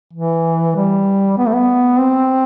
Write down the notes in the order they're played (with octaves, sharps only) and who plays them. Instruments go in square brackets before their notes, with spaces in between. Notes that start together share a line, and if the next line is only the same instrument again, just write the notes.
[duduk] E3
G3
B3
A3
B3
C4